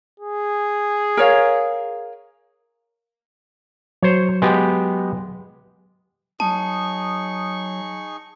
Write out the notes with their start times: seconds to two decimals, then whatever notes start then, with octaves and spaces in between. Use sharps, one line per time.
0.20 G#4
1.17 A#4 C#5 F5
4.03 F#3 C5 C#5
4.42 G#3 B3 G4
6.40 F#3 D#4 G#4 A5 C#6